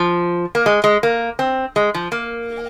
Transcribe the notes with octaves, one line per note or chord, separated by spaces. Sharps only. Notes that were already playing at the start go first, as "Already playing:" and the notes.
Already playing: F3
A#3
G#3
G#3
A#3
C4
G#3
F3
A#3